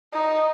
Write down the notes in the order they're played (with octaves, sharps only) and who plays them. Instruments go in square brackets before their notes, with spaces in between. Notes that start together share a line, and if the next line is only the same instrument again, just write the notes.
[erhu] D#4